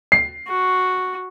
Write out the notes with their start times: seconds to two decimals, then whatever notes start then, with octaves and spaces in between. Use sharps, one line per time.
0.12 C7
0.48 F#4